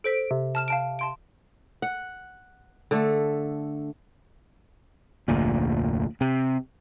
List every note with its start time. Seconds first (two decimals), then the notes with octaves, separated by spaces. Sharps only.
0.04 A4 C5 B6 D7
0.31 C3
0.55 A5 F6 E7
0.68 F5 A5 D7
0.99 A5 C6 D7
1.82 F#5
2.91 D3 A3
5.28 F1 D2 A#2
6.21 C3